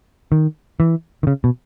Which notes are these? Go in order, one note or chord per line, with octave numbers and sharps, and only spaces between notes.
D#3
E3
D#3
C#3
B2